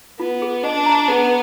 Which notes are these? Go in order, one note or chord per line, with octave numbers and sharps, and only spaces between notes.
B3 F4
G#4
D4 D#5
A#5
B3 G#4